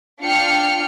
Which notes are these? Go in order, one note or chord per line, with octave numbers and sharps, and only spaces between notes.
D4 F4 F5 G5 F6 C#7